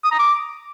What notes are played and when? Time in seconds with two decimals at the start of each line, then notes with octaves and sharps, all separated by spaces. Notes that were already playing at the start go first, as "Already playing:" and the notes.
0.04 D#6
0.11 A#5
0.19 D6